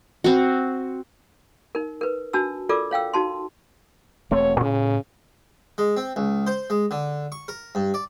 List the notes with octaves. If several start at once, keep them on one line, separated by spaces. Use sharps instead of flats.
C4 F#4
D#4 A#4
A#4 B4
D4 F#4 A5 E6
F4 A4 A#4 D5 D6 E6
C#5 F5 G5 E6
D#4 F#4 A5 C6
E1 A3 C4 C#5
A2 C#3
G#3
C4
C#2
C5
G#3
D3
C#6
A#4
G2
D5